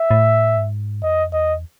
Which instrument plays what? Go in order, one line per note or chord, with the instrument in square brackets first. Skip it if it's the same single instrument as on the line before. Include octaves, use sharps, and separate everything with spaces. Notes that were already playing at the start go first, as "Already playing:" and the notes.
Already playing: [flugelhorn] E5
[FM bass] A2
G#2
[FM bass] F2 [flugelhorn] D#5
[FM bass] E2 [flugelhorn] D#5